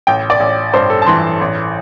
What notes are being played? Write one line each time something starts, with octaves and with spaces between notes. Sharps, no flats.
A1 G5
D5
A1
G2 C5
A4
A5
E3 C6
A1